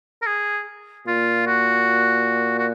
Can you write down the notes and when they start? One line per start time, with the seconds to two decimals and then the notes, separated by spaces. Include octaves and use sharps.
0.22 A#4
0.26 G#4
1.06 A#2 F4
1.47 F#4
2.59 F#4